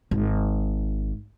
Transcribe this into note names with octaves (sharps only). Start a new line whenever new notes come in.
G#1